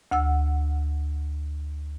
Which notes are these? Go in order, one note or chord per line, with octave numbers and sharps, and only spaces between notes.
D2 F#5 E6